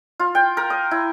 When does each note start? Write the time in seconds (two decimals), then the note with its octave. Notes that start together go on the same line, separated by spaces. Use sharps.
0.20 F4
0.35 G5
0.57 A#4
0.70 D#6
0.91 E4